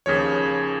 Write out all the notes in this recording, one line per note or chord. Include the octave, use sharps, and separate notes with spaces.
D#2 C#3 F3 C#5